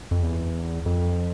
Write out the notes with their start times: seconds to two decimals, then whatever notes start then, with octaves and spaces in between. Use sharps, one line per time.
0.11 F2
0.23 E2
0.86 F2